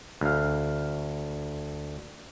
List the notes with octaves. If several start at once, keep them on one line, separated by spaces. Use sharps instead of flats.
D2 F5